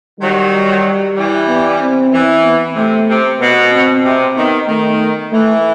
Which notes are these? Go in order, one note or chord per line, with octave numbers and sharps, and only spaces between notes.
D#3 F#3 G3
E3 G3
B3
C4
E3
B3
C3 A3
C3
B2 B3
C4
C3
D#3 B3
D#3 A3
E3 A3